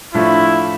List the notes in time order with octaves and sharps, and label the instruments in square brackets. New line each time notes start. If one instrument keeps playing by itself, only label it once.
[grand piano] A2 F3 A3 D4 F4 [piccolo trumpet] E4